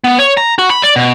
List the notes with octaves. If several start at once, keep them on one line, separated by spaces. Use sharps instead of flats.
B3
C#5
A#5
F#4
B5
D5
B2